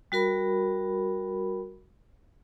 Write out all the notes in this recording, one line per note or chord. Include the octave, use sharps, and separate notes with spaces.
G3 F#4 A#4 B5